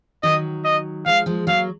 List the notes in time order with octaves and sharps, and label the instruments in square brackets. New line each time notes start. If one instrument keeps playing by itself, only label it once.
[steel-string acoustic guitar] D#3 F#3 [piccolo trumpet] D#5
[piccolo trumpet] D#5
[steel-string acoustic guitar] F3 G#3 [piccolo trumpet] F5
[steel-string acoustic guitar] F3 G#3
[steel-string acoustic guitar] F#3 A#3 [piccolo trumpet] F5